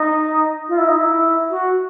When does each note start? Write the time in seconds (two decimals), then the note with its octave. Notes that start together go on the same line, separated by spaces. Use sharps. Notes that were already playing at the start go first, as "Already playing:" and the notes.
Already playing: D#4
0.69 F4
0.78 E4
0.88 D#4
0.97 E4
1.50 F#4